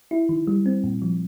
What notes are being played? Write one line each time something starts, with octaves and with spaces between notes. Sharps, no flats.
E4
D#3
G3
C4
A#2
F3